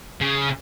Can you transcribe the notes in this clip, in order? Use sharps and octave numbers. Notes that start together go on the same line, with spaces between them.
C#3